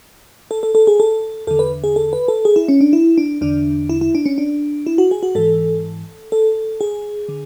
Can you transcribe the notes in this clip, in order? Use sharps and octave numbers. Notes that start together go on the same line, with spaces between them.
A4
A4
A4
G#4
A4
E2 D3 A4
B4
G#4
A4
B4
A4
G#4
E4
C#4
D4
E4
D4
E2 D3 D4
E4
E4
D4
C#4
D4
E4
F#4
G#4
F#4
G#2 E3 A4
A4
G#4
D3